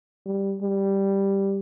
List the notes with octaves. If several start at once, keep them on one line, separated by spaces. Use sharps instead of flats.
G3
G3